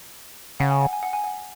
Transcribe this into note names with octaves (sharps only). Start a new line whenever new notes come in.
C#3 F#5
G#5
F#5
G#5
F#5
G#5
F#5